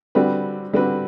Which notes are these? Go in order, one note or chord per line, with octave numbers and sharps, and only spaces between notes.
D3 G3 C4 F#4 B4
D3 G3 C4 F#4 B4